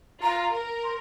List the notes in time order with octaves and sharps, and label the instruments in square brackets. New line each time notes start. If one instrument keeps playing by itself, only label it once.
[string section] F4 [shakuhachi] A#5
[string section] A#4
[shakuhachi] C6